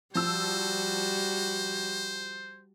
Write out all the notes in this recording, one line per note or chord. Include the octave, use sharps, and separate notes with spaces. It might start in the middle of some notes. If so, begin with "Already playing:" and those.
F3 G3 F#4 C5 E6